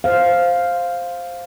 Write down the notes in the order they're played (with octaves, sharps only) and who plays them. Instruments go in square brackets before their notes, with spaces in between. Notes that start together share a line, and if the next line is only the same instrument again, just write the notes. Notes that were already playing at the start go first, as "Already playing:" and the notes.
[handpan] C5 F5